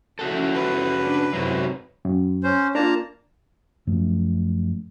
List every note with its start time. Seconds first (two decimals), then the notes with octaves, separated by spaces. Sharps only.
0.19 C#3 F3 C#4 E4 F#4 A4
0.54 B4
1.01 D4
1.34 F#2 C3 F#3 E4 F#4
2.05 F#2
2.43 C#4 C5
2.75 A#3 D4 F4 A5 A#5
3.87 F#2 F3 A3